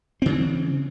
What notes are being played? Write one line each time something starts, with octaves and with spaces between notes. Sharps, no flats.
C#3 E3 C4